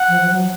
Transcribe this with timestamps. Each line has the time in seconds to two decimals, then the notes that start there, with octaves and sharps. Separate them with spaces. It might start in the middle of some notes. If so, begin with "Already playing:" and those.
Already playing: F#5
0.09 F3
0.21 F3
0.30 F#3